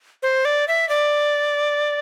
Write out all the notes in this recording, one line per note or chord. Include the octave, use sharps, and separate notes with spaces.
C5
D5
E5
D5